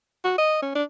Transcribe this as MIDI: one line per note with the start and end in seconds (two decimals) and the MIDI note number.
0.24 0.36 66
0.38 0.61 75
0.62 0.74 61
0.75 0.83 62